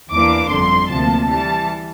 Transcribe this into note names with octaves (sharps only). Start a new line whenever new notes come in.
E2 E3 A#3 D4 D6
G1 F2 D3 C6
D2 C3 F3 A#3 A5
E3 G3 A5